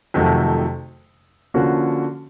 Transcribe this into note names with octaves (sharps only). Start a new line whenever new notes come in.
F2 C3 D#3 F#3 A3
D3 F3 A#3 C#4 F#4